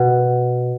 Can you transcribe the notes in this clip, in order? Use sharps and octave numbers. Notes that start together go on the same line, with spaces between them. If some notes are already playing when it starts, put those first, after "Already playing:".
Already playing: B2